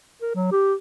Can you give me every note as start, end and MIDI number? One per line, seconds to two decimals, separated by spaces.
0.22 0.31 70
0.35 0.48 54
0.52 0.74 67